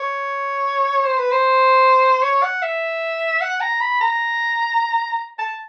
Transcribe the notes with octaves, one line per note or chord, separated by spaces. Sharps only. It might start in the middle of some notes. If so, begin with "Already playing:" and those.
Already playing: C#5
C5
B4
C5
C#5
F#5
E5
F#5
A#5
B5
A#5
A5